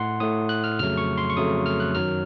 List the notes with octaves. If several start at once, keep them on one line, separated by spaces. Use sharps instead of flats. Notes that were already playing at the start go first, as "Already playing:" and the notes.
Already playing: A2 A3 F#5 C6
A2 A3 D#6
F#6
F6
F2 C#3 F#3 A3 F6
C#6
C6
C#6
F2 C#3 F#3 A3 D#6
F6
F#6
F#2 D#3 F#3 F6